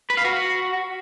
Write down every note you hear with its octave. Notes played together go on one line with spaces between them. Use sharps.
B4
F5
F#4